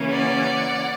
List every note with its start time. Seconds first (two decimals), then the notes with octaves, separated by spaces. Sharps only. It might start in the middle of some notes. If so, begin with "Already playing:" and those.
Already playing: C#3 E3 A#3 C#4
0.10 D5 F#5